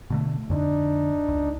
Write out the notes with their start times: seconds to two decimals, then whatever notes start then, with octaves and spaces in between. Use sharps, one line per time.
0.10 B2 D3 A3
0.50 F2 D3 D4 D#4
1.28 C#2